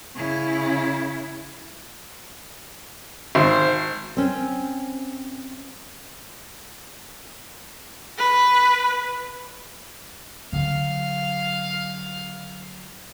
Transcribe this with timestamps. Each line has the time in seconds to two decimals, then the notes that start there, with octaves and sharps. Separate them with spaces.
0.15 C#3 E4
3.35 G#1 C5
4.17 C4 C#4
8.18 B4
10.52 D3 F#3 F5